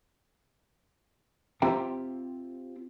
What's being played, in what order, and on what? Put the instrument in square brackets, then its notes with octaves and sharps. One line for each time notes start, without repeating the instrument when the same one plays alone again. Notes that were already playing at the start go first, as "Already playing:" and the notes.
[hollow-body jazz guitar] C4 F4 G4 E5 G5 A#5